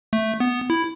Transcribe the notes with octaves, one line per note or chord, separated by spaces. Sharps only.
A3
B3
E4